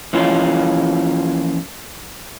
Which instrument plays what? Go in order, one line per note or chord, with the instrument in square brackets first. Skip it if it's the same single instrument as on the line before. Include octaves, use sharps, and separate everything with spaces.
[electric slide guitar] E3 F3 A#3 C#4 F4